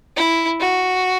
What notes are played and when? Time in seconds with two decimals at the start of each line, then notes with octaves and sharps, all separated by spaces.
0.16 E4
0.60 F#4